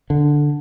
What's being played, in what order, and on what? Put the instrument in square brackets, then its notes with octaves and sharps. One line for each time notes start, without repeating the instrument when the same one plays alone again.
[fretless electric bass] D3